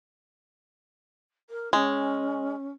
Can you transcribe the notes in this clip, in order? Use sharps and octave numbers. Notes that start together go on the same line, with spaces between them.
A#4
G#3 C#4